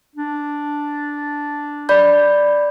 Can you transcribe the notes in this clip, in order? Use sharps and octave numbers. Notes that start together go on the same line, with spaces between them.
D4
D5 B5 G6